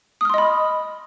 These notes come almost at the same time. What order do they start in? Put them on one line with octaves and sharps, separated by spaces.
D#6 F6 C6 D#5 B5